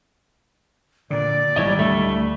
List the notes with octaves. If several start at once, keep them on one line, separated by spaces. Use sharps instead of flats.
A#2 D3 D5
G#1 A#2 F#3 G3 E4 C#5 D#5
D2 A3 E5